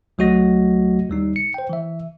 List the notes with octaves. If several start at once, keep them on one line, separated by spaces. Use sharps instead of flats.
C#2 F#3 A3 F#4 D#5 A#6
D#2 G3 D#4
C#7
C5 G5
E3 E5